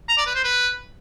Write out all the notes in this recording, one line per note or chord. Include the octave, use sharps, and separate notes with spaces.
A#5
D5
B4
C5
B4